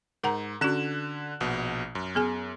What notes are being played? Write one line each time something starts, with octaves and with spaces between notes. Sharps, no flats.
G#2 A#4 F#5 A#5
D3 C#4 F#4 F#6 E7
A#1 B2
F#2
B3 G#4 G#5